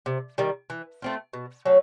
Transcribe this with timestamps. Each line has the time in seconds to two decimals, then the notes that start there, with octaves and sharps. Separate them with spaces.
0.06 C3
0.38 D#3 G3
0.70 E3
1.02 A3 C4 F4
1.33 B2
1.65 F#3 A3 C#4